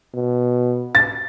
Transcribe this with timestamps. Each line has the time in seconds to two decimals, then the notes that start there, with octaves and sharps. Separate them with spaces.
0.14 B2
0.95 A6